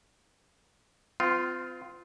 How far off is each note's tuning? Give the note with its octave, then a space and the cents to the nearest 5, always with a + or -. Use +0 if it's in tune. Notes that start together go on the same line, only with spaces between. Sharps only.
C4 -40 F4 +0